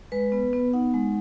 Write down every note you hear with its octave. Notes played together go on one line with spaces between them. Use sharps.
G#3 B4
B3
B3
D#4 F#5
G#3 F#5